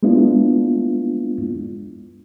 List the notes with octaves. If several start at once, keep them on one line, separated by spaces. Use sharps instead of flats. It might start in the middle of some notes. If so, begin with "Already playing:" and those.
G#3 A#3 B3 D4 E4 F4